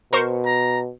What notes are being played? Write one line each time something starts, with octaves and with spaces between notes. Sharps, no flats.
B2 A#4 C5 C#6
A#5